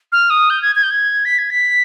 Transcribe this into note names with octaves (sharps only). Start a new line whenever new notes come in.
F6
D#6
G6
G#6
G#6
G6
G#6
B6
G#6
B6